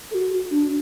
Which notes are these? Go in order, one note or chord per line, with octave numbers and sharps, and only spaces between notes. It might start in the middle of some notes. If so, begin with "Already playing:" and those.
A4
F#4
D4